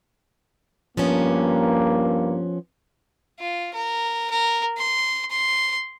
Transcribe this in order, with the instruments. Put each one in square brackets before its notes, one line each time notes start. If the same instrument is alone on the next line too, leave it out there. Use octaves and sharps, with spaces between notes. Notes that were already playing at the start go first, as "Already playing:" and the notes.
[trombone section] G2 A#3 [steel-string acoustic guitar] F3 B3 C#4
[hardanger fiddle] F4
A#4
A#4
C6
C6